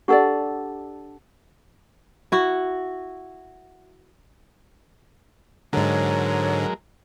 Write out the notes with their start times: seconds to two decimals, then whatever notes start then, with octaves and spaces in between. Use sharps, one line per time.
0.08 D4 G4 A4 D5 F#5 E6
2.32 E4 F#4
5.73 G#2 D3 F#3 G#3 A#4 C#5